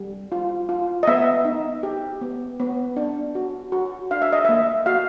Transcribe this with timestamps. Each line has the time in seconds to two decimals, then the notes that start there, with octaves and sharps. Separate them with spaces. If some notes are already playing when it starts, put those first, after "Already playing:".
Already playing: G3
0.32 F4
0.69 F4
1.03 D#5
1.07 B3 E5
1.45 D#4
1.83 G4
2.21 B3
2.60 B3
2.97 D4
3.35 F#4
3.72 F#4
4.11 D4 F5
4.22 E5
4.32 D#5
4.45 A#3 E5
4.86 F#4 F5